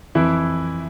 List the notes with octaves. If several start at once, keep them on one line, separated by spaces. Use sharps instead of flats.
F2 E3 E4